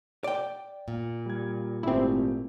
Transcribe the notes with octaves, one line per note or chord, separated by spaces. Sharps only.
D5 G5
A#2
G3 G#6
G#1 A3 C4 E4 G4